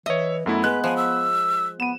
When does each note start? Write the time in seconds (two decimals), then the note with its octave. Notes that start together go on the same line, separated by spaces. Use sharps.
0.06 E3 C#5 D#5 E5
0.46 F#2 A3 B3 E4
0.64 G#3 B4 F#6
0.84 F3 G#5
0.97 E6
1.80 B3 D#7 E7